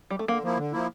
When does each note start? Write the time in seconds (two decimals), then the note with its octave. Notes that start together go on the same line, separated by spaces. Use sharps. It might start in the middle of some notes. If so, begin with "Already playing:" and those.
0.10 G3
0.19 A3
0.28 D3 A#3
0.43 F3 A#3 E4
0.57 D3
0.72 F3 A#3 E4